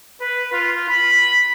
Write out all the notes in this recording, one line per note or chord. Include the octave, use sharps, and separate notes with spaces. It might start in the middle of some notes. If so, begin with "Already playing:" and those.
B4
F4
B5